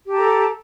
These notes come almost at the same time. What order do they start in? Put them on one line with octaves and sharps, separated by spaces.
G4 A5 A#5 A4